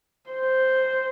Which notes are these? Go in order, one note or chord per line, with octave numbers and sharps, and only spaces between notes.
C5